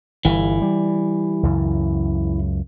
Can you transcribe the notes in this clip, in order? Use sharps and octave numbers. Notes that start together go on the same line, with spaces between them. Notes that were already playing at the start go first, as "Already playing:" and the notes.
G1 E3
G3
C#2 F#2 C#3